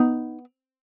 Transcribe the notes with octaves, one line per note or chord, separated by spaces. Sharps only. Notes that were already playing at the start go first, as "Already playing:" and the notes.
Already playing: B3 D#4